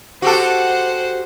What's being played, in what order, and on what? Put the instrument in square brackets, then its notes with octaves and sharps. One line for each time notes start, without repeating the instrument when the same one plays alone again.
[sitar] F#4 G4 A4 [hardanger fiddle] C5 F#5